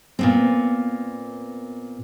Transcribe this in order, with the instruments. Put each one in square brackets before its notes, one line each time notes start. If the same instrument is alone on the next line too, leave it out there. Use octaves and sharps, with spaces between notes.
[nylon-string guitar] A#2 B3 C4